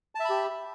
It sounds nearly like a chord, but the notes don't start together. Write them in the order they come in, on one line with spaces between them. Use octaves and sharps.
A5 E5 B5 G4